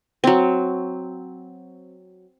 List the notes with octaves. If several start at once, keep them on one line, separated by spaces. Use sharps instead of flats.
F#3 C4